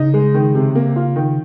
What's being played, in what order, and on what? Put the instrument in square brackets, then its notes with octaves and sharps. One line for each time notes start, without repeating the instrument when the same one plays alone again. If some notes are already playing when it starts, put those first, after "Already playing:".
Already playing: [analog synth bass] C#3 [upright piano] D#4
[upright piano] G#3
D#3
C3
A#3
F4
D#3